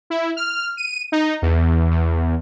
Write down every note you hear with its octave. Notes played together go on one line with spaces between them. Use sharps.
E4
F6
D#7
D#4
E2
E2